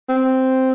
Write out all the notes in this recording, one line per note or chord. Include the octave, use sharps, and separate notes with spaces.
C4